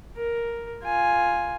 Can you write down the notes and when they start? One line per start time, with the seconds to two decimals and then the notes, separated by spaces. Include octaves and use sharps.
0.17 A#4
0.84 F4 G#5